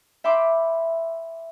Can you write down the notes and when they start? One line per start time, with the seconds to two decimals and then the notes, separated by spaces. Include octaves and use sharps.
0.24 E5 G5 B5 C6 D6